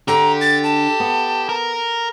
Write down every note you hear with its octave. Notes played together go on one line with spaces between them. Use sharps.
D3 G4 A#5
A6
A5
B3
A#4